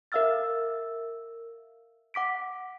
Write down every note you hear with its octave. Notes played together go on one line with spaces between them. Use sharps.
A#4 E5 F5 E6 F6 A6
F#5 D6 B6 D7